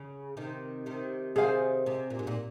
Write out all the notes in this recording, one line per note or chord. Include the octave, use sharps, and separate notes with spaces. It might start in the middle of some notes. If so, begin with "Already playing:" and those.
Already playing: C#3
C3 D#3
C3 D#3
C3 D#3 G#4 C5 F5 G#5
C3
A#2
G#2
A#2